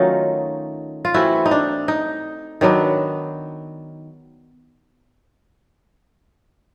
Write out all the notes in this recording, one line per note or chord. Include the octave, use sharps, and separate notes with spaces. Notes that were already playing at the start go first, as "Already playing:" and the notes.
Already playing: D#3 F#3 A3 C#4 D#4 F4
F4
E3 A3 C4 E4 F#4
D#4
D4
D#4
D#3 F#3 B3 D4